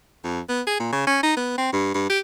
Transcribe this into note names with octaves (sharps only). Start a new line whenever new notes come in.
F2
B3
G#4
A#2
C#3
C#4
D#4
B3
C4
G2
G2
G4